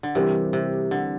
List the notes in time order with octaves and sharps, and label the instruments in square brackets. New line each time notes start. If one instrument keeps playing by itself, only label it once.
[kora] D3
[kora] C3 [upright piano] E3 G3 C4 G4 A#4
[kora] C3
D3